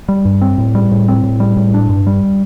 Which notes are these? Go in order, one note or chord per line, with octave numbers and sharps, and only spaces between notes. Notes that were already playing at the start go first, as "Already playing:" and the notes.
G3
G2
C4
A2
G3
A2
C4
A2
G3
A2
D4
G2
G3